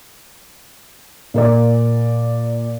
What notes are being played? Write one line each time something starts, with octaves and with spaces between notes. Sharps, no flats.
A#2 A#4 D5